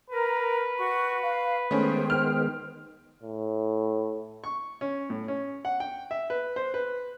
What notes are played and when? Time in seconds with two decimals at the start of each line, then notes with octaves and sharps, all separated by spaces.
0.10 A#4 B4
0.78 F#4 C#6
1.22 F5
1.71 D#3 G#3 A3 B3 C#4 C5 G5
2.10 F6
3.23 A2
4.44 C#6
4.81 C#4
5.10 A2
5.28 C#4
5.65 F#5
5.80 G5
6.11 E5
6.30 B4
6.56 C5
6.74 B4